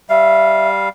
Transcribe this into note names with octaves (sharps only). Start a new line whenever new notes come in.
G3 E5 F5